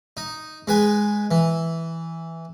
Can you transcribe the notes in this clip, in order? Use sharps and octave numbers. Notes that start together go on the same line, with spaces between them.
D#4
G#3 B4 G#5
E3